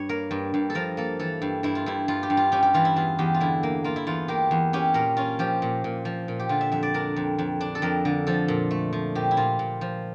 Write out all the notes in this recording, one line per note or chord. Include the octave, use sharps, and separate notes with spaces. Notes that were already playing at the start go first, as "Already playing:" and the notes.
Already playing: G2 C#5
A#3 A#4
G2
G2
A4
F3 A#4
A#3 A4
E3 A4
G2
G2 E4
F4
G2 E4
G2 F4
G4
G2
F4
C#4 G4
G4
E3 F4
E4
E2 F4
E2 G4
F4
D3 E4
A#3
A#3 F4
E4
E2 F4
A#3 G4
E2
C#4 G4
A#2 A#4
C#4 F4
F3 G4
A#2
A#2
F3
A#2
G4
D3 F4
E5
F2 E5
D5
D4 A#4
F2
F2
D4
A4
F2 A#4
D3
F3 A4
A#2
A3
F3
A#2 G4
E4
A#2 F4
A#2
F3